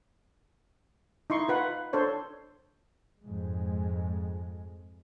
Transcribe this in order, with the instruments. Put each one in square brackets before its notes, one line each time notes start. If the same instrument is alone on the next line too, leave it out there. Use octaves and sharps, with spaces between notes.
[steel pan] D#4 E4 C6 C#6
F4 B4 F#5
D4 A4 C5 C#5
[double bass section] F2 G#2 G#3